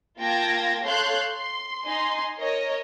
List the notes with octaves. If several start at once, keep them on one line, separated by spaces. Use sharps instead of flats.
A#3 F4 G5 A5 G#6 A#6
A4 C#5 F5 C6 F#6 G6
C6
D#4 G#5 C6
A#4 C#5 D#5